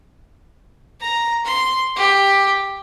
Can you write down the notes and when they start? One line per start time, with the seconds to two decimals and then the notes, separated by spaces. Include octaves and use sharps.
1.01 A#5
1.45 C6
1.96 G4